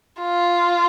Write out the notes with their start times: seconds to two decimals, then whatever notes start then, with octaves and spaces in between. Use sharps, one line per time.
0.22 F4